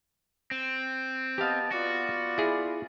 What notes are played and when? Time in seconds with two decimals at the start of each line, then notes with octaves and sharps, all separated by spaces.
0.51 C4
1.38 B3 G4 D#5 F5 A5
1.72 B3 F4 F#4 D5
2.38 E4 G#4